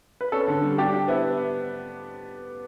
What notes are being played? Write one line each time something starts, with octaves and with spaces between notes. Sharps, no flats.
B4
C#4 A4
D3
G3
D4 G4
G4
B3 E4